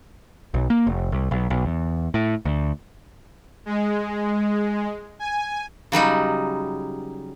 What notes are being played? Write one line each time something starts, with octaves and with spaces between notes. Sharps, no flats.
B1
A#3
F1
C2
B1
B1
E2
A2
D2
G#3
G#5
C#3 F#3 G3 D#4